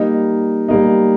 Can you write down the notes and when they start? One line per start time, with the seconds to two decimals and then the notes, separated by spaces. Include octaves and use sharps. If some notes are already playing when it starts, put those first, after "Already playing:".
Already playing: G3 A#3 D#4
0.68 G3 A#3 D#4